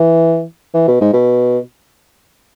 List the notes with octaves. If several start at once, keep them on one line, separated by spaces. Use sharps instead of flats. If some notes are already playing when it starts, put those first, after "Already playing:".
Already playing: E3
E3
B2
G#2
B2